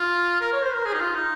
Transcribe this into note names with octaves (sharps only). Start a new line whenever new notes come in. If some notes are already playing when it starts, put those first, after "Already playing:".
Already playing: F4
A#4
C#5
C5
A#4
G#4
D#4
F4
D#4